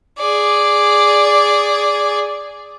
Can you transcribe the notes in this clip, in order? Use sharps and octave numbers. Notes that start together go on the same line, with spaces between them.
G#4 D5